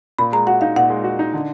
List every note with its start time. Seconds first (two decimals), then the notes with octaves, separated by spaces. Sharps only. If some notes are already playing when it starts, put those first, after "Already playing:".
0.19 A#2 B5
0.33 G#3 A#5
0.47 F#4 F#5
0.61 D#4 F5
0.76 A#2 F#5
0.90 G#3
1.04 F#4
1.19 D#4
1.33 D3